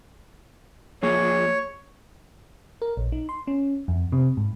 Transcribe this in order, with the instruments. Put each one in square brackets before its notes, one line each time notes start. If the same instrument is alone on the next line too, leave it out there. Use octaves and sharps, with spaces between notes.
[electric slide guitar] F3 A#3 G#4 [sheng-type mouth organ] C#5
[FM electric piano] A#4
A#1
D#4
C6
C#4
F2
C3
G#2